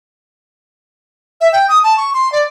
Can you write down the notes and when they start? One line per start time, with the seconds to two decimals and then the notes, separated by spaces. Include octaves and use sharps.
1.41 E5
1.53 G5
1.69 D#6
1.84 A5
1.97 C#6
2.14 C6
2.32 D5